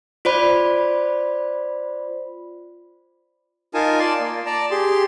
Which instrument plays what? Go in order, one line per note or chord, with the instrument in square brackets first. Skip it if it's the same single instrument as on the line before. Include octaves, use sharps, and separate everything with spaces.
[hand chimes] F4 C5 D5 B5
[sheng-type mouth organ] D#4 F4 A#4 G#5 A5
D5 A5 C6
A#3
D5 A5 A#5
G4 G#4 C6